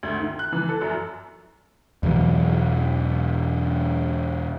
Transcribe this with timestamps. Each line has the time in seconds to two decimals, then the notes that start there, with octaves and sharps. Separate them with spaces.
0.03 D2
0.20 D#3
0.39 F#6
0.53 E3
0.69 A4
0.81 F#2
2.03 E2 B2 E3 F#3